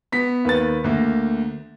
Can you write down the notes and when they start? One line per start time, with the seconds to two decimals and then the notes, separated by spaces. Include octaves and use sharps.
0.12 B3 B6
0.45 D#2 B4 A6
0.84 D2 A#3